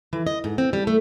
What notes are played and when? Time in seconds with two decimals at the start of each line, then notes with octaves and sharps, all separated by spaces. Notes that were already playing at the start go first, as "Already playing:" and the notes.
0.13 E3
0.27 D#5
0.44 G#2
0.58 C4
0.73 G3
0.87 A3